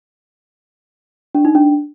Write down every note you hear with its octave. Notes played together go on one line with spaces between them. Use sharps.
D4
D#4
D4